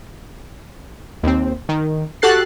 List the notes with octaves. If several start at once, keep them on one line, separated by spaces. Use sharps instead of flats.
D#2 C4
D#3
F#4 G4 A4 F#6 A6 C7